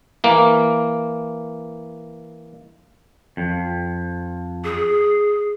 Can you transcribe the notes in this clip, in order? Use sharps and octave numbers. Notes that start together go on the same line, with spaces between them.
E3 A#3
F2
G#4